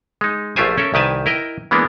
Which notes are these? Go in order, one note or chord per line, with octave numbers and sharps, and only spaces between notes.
G#3 D#4
A#1 A3 F4 G4 C5 G#5
C#4 A4 A#4 E5
C2 D#3 G4 B4 G#5 A5
E4 A#4 D#5 G5
E3 G#3 A#3 B3 D4